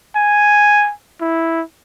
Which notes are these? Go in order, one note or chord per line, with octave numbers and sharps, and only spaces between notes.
G#5
E4